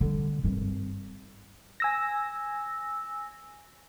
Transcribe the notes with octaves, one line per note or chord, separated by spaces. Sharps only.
D3 G3
G#1 G2
G#5 E6 A#6